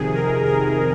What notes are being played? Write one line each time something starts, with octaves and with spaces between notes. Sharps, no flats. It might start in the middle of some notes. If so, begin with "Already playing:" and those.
Already playing: F2 C3 D#3 G#4
A#4
A#4